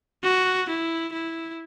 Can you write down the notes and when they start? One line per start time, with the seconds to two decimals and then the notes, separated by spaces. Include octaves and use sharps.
0.24 F#4
0.69 E4
1.13 E4